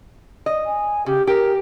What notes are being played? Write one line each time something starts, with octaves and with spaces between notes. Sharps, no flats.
D#5
G#5
C#3 G4
G4 A#4